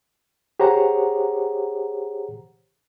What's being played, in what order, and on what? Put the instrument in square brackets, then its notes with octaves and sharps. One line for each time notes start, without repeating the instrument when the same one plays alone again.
[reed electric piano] G4 G#4 C5 C#5 F#5 A#5